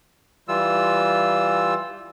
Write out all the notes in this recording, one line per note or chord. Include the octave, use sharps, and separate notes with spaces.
E3 G3 F4 E6